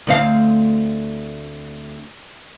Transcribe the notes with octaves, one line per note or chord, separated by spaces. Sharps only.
D2 C4 F5